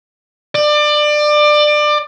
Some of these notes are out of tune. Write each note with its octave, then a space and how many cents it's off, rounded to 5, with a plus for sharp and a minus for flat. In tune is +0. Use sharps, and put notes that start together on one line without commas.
D5 +25